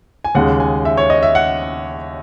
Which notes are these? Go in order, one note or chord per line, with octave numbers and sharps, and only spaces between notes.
G#5
D#2 C#3 G#3 F#5
G#5
E5
C#5
D#5
E5
F#5